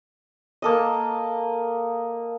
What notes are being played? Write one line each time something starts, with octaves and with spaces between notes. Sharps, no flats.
A#3 A4 D#5